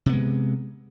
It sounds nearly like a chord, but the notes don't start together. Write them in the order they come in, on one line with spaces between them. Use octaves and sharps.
C3 B3 G#3